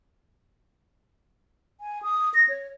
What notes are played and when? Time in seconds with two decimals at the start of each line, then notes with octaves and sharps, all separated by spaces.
1.81 G#5
2.03 D#6
2.34 A#6
2.49 C#5